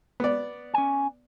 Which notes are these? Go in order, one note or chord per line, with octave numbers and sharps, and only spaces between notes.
B3 D5
C#4 G#5